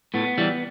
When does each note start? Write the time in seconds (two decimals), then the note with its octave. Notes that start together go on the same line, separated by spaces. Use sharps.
0.14 A2 B3
0.38 E3 G3